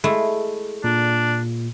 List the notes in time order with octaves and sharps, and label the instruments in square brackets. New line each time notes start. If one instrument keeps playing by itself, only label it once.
[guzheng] G#3 A3 E4
[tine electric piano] A#2 [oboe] D4